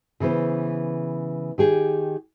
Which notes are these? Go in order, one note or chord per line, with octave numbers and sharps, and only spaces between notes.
C#3 E3 B3 C5
D#3 G4 G#4